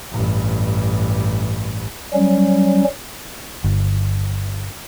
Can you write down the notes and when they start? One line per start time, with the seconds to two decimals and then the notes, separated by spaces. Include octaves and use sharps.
0.11 A1 G2
2.14 F#3 G3 C#4
3.64 G1